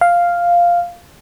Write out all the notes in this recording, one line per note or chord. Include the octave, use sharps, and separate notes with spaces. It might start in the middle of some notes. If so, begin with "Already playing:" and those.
F5